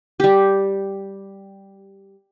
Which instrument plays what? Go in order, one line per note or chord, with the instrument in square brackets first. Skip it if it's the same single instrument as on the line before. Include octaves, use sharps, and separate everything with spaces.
[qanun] G3 G4